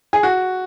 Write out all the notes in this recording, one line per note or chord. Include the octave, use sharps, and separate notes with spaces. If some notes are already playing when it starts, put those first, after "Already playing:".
G#4
F#4